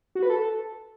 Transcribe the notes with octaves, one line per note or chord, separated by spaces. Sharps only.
F#4
B4
A4